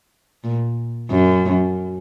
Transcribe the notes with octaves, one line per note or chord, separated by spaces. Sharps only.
A#2
F#2